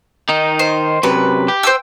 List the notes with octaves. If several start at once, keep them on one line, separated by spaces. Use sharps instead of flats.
D#3 D#4
C5
F#2 C3 B4
G4
C5 G5 E6